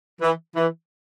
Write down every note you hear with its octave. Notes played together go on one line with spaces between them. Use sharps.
E3
E3